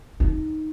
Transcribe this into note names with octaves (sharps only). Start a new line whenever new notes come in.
D#4